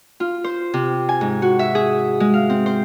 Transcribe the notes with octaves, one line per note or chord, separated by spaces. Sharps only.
F4
C5
C3
G#5
G#2
F#4
E5
G#4
G#3
F5
C4
C5